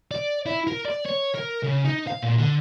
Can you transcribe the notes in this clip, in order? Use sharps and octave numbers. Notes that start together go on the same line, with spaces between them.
D5
E4
A#4
D5
C#5
A#4
C#3
D#4
F5
A#2
D3